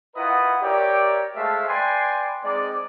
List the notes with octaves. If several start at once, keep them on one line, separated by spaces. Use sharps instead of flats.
E4 F4 A#4 B4 D#5 F#5
G4 A#4 C#5 D5 E5 G5
G#3 A3 C5 E5 F5 A5
B4 D5 G5 G#5 C6
G#3 C4 D#4 D5